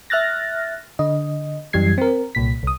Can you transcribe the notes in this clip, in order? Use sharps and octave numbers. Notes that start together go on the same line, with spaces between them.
E5 F6 F#6 A6 A#6
D3 D#5
F#2 E3 G3 G#6 C7
C4 A#4
C2 A#2 B6
C2 D#6